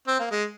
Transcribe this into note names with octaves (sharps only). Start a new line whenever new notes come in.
C4
A#3
G#3